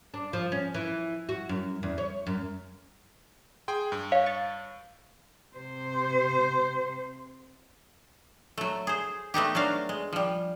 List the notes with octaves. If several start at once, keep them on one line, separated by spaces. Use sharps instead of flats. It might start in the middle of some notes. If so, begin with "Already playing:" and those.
D4
F3
C#4
E3
F#4
F#2
E2
C#5
F#2
G#4 G5 C6
G2
C#5 F5
C#6 A6
C3 C5
F#3 A3
G#4 C5
A3 B3 D#4 G4
F#3 D4 F#4 F5
G#3
F3 G3